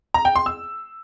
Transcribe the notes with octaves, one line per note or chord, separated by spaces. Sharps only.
A#5
G5
C6
E6